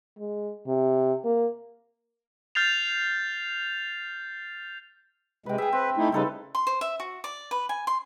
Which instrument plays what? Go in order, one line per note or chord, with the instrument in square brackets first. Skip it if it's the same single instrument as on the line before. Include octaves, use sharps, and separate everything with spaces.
[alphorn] G#3
C3
A#3
[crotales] F6 G6 A6 C7 F7
[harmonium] C3 G#3 [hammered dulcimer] B4 G5
[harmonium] G#4 [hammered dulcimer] E5 G5
[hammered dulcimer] C4 [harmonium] B4
[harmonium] A3 D#4 E4
[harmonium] C#3 G3 D#4 [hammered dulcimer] E4 A4 B4
[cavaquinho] C6
C5
E5
F#4
D5
B4
G#5
C6